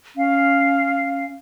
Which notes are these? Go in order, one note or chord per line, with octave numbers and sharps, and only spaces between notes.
C#4 F5